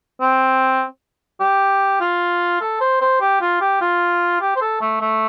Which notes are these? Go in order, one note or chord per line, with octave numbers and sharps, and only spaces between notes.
C4
G4
F4
A4
C5
C5
G4
F4
G4
F4
G4
C5
A4
A3
A3